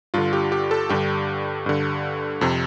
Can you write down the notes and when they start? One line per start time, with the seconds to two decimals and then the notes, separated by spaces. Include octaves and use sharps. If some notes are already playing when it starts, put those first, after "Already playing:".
0.14 G2 D3 F4
0.33 G4
0.52 G4
0.71 A4
0.89 G2 D3 G4
1.66 G2 D3
2.41 F2 C3